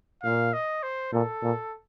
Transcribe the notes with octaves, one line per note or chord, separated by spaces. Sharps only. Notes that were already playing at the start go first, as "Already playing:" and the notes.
A#2 F5
D#5
C5
A#2 A4
A#2